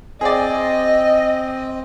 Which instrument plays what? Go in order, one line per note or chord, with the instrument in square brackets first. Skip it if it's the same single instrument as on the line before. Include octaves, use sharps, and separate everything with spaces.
[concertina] C4 [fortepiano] G#4 D5 [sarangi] D#5